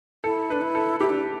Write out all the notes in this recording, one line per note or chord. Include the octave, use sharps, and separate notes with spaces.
E4 A4
D4 B4
E4
A4
E4 G4
D4